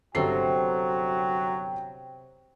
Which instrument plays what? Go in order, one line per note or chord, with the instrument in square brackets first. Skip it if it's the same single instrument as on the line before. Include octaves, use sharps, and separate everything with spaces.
[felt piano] G1 A4 C7 [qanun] C3 [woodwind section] F#3 F#4 [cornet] G5